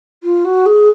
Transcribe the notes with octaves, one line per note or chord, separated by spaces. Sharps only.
F4
F#4
G#4